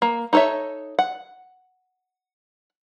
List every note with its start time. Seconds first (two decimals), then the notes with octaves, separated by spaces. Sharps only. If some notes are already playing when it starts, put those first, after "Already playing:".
0.02 A#3
0.33 D#4 A4 C5 C#5 E5
0.99 F#5